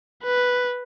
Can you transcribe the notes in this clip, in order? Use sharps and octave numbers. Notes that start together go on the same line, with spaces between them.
B4